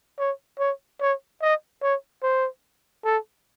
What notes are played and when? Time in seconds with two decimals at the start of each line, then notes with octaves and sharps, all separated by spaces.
0.19 C#5
0.59 C#5
1.01 C#5
1.42 D#5
1.82 C#5
2.23 C5
3.05 A4